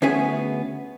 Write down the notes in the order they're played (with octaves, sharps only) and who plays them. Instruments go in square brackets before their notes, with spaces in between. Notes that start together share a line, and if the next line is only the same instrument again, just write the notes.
[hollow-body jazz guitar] D2 B3 C#4 G#4 E5 G#5